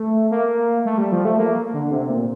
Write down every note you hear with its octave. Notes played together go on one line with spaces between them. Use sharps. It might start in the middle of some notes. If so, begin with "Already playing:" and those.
Already playing: A3
A#3
A3
G3
F3
A3
A#3
D3
C3
A#2